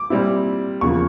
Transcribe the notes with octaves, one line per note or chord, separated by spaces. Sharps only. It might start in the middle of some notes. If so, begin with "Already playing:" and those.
Already playing: D6
A#2 G3 C4 E4
E2 C#3 F3 A#3 C#6